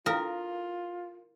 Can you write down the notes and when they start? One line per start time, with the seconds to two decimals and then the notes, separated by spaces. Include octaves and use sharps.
0.06 E4 F4 A4 A#4 F5